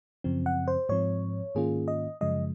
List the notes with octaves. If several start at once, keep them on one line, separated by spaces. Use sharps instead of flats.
F#2 C#3 F3 C4
F#5
C5
G#2 F3 C4 C#5
G#2 D#3 A#3 C#4 F4 G#4
D#5
F#2 C#3 F3 G#3 D#5